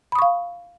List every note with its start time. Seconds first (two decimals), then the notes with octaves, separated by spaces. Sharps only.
0.12 B5
0.15 D#6
0.19 C#6
0.22 F5